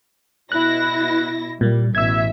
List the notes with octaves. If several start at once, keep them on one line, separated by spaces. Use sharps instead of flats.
B2 E4 F#6 A#6
A#2 G3 A#3
A1 B2 E5 E6 G#6